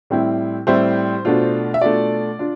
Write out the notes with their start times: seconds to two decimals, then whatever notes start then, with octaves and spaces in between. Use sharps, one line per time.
0.10 A2 G3 C4 E4
0.67 A2 G3 C4 E4 C5
1.25 B2 A3 D4 F4
1.74 E5
1.81 B2 A3 D4 F4 D5
2.39 D4 F4